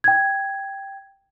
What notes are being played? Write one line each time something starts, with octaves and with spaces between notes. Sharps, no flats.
G5 G#6